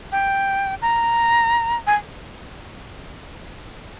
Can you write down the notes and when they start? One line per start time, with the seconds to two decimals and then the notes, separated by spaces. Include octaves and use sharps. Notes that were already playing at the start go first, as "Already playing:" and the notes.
0.12 G5
0.82 A#5
1.87 G#5